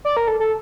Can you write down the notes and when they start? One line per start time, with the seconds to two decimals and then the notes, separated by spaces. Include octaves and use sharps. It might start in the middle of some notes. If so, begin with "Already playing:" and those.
0.05 D5
0.17 A#4
0.28 A4
0.40 A4